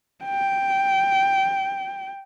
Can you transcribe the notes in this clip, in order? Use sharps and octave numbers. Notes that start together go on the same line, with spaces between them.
G5